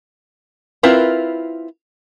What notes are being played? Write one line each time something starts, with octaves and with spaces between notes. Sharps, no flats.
C4 E4 F4 A#4 B4